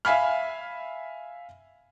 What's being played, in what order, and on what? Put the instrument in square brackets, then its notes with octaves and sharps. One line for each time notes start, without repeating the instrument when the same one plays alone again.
[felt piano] E5 F5 G#5 B5 F6